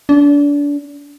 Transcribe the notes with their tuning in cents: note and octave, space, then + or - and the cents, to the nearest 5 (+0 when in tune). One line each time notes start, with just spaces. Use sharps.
D4 -30